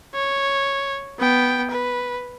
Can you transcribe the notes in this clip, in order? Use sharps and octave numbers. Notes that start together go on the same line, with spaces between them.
C#5
B3 G5
B4